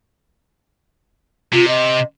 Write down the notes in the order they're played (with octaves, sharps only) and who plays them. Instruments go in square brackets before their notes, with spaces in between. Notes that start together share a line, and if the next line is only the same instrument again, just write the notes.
[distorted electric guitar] C3 [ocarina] F4
[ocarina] D#5